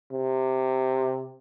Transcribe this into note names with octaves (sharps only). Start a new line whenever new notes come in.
C3